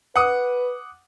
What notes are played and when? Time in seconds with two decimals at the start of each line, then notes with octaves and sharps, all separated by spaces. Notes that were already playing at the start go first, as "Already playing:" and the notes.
0.16 B4 F#5 D6 D#6